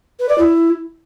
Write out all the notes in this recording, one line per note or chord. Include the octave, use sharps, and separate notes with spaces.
B4
D5
E4